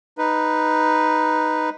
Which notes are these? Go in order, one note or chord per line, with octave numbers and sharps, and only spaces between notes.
D#4 B4